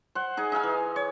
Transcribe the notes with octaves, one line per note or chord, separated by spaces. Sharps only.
C5 F#5
D#4 G#4 G#5
D#4 E5 F5 G#5
E3
C#5